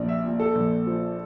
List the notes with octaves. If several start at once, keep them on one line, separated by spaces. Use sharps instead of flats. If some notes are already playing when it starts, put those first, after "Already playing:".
Already playing: A#1
E5
A#2
A4
A#1
F3